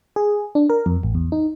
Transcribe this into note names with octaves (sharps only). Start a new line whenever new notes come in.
G#4
D4
A#4
F2
A1
E2
D#4